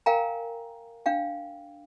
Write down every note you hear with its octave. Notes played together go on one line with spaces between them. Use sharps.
A#4 F5 G5 G#5 A#5
D4 F5 G5